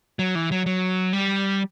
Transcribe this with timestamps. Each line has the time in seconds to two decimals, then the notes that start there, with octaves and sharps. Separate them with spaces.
0.19 F#3
0.35 E3
0.51 F#3
0.66 F#3
1.13 G3